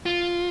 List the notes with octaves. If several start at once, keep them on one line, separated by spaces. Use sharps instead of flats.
F4